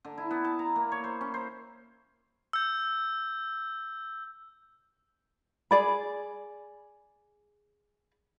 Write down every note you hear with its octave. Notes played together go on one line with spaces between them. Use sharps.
D3
E4
B3
A5
A#5
A#3
C#5
C5
C#4
C5
E6 G6
G#4 D5 B5